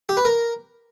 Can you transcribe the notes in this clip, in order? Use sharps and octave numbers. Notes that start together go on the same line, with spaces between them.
G4
B4
A#4